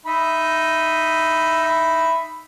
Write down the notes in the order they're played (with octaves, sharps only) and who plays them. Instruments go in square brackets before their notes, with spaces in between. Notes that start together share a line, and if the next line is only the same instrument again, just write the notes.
[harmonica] D#4 E5 B5